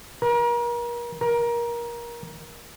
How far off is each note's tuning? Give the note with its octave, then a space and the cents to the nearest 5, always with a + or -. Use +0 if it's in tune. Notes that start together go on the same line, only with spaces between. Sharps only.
A#4 +35
A#4 +20